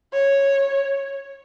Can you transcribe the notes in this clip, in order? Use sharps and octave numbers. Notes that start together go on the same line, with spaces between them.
C#5